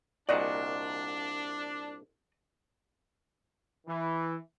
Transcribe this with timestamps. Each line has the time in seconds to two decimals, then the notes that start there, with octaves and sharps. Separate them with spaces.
0.29 C2 A#2 D4 F#4 D5 D#5 A#5
3.86 E3